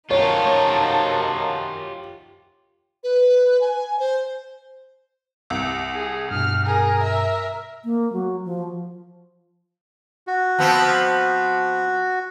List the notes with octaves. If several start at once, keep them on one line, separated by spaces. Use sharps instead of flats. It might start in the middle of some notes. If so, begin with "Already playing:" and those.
F#2 D#3 F3 D#4 F4 G4 A4 C#5
B4
G#5
C5
C2
G#4
G2 B2 F6
G#4 A#4
E5
A#3
F#3
F3
F#4
F3 B3 C4